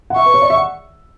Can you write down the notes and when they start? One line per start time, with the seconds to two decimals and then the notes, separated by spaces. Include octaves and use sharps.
0.10 F#5
0.16 E5 C#6
0.26 B4
0.34 C#5
0.42 D5
0.50 E5
0.57 F#5